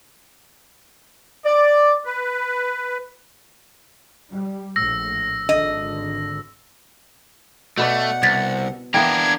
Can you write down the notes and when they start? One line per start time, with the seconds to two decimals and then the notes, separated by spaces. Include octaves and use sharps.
1.45 D5
2.05 B4
4.31 G3
4.76 A#1 A2 E6 A#6
5.49 G#1 D3 D#5
7.78 B2 A3 B4 D5 F#5
8.23 C2 G#6 A6 B6
8.94 E3 A#3 B3 D4 A#4 G5 G#6